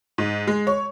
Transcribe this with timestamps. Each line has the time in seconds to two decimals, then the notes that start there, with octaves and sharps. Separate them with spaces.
0.18 G#2
0.47 G#3
0.67 C#5